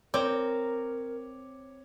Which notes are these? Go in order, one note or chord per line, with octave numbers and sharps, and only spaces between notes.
C4 A#4 C#5 D6